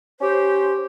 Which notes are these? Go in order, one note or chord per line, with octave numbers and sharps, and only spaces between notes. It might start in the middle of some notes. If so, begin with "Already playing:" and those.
C#4 G4 C5